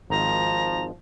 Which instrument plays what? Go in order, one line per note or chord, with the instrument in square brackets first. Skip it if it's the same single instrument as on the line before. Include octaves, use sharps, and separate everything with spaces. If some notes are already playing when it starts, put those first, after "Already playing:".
[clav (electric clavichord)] G#1 D#3 C5 [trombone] F3 [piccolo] A#5